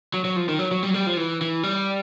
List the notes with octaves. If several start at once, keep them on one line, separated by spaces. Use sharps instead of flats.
F#3
F#3
F3
D#3
F#3
F#3
G3
F#3
G3
F3
E3
E3
G3